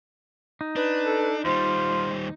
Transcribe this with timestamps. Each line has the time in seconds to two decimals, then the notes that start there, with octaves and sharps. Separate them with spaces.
0.61 D#4
0.76 D4 B4
1.06 A4
1.45 D#2 G3 F4 C5